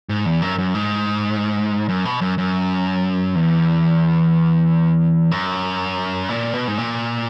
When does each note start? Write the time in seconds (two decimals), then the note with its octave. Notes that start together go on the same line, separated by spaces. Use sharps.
0.09 G#2
0.26 E2
0.42 F#2
0.58 F#2
0.75 G#2
1.89 F#2
2.05 B2
2.21 F#2
2.38 F#2
3.35 E2
5.31 F#2
6.29 A#2
6.54 B2
6.67 G#2
6.78 A#2